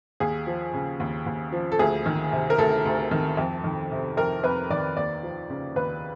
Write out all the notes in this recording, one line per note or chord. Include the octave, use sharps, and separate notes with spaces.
D#2 G#4
F3
C#3
D#2
D#2
F3
A4
D2 G#4
D#3
C3
A#4
D2 A4
D2
D#3
F2
D#3
C3
F2 A#4
F2 B4
D#3 D5
D#2 D5
F3
C#3
D#2 B4